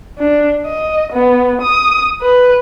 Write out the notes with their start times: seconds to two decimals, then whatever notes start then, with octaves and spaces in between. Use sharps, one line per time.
0.19 D4
0.66 D#5
1.13 B3
1.62 D#6
2.22 B4